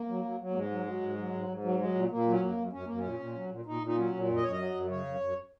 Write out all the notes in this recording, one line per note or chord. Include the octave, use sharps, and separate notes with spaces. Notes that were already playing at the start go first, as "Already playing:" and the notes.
Already playing: A#3
F#3
F#3
F#3
A#3
G#2 G#3
F#3
F#3
G#2
F#3
G#2
G#2
F#3
F#3 G#3
A#2
A#2 A#3
F#3
C#4
F#2 A#3
F#2
F#2 C#4
F#2 A#3
C#4
A#2
A#2
F#3
A#2
A#2 D#4
A#2
D#4
F#3 C#4
A#2
F#2
D#5
F#2 C#5
D#5
F#3
F#2
C#3 C#5
F#2
F#2